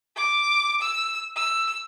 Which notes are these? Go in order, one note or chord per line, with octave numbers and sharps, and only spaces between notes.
D6
E6
E6